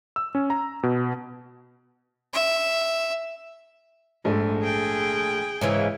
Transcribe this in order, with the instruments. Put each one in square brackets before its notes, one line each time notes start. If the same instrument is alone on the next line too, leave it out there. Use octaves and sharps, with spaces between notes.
[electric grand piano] E6
C#4
A#5
B2
[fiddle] E5
[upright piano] A#1 A3 [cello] G#2
[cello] G#4 G5
[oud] G#2 C#3 E3